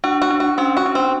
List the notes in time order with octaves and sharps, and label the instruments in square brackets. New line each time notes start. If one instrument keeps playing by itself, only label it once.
[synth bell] D4 [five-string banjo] F#4
[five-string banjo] F#4
[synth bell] D4
[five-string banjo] F#4
[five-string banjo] C4 [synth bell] C#4
[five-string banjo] F#4
[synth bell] D4
[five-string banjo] C4